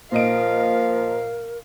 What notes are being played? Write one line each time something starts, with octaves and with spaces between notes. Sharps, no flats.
A#2 F3 A#4 D#5 F5 D7